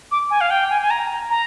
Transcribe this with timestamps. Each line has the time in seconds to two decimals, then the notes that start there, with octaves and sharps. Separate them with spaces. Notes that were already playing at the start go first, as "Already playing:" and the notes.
0.12 D6
0.30 G#5
0.41 F5
0.50 G5
0.70 G#5
0.82 G#5
0.91 A#5
1.30 A#5